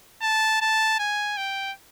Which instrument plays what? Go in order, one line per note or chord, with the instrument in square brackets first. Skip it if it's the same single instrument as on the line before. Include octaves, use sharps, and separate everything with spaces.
[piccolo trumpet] A5
A5
G#5
G5